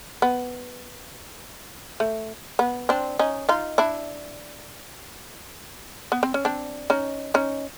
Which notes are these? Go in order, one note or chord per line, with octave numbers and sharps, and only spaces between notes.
B3
A3
B3
C4 D4
C#4 D#4
D#4 F4
D4 E4
B3
C4
C#4
C4 D4
C#4 D#4
C#4 D#4